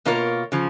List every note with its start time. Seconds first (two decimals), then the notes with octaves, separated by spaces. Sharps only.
0.05 B2 A#3 F4 A#4 C#5
0.52 C#3 F3